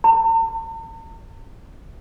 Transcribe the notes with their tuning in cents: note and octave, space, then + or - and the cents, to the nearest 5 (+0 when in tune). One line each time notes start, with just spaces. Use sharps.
A5 +45